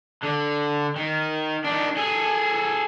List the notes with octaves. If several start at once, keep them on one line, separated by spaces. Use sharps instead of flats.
D3
D#3
D#3 D4
G#4 A4